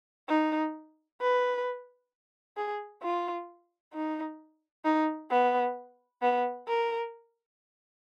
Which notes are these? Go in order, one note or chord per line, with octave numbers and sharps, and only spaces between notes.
D#4
B4
G#4
F4
D#4
D#4
B3
B3
A#4